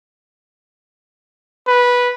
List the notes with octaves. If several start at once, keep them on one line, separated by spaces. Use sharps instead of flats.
B4